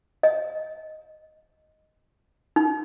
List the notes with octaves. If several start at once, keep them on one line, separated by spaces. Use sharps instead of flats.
D#5
D#4